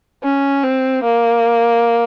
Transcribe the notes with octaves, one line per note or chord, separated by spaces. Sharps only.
C#4
C4
A#3